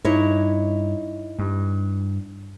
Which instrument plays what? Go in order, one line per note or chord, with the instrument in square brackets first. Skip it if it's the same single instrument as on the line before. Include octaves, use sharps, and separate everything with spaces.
[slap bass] G2 [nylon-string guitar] D#4 E4 C#5
[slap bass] G2